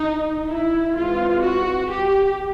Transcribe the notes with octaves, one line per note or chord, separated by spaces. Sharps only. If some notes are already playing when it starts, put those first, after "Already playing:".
Already playing: D#4
E4
E3 G#3 C4 F4
F#4
G4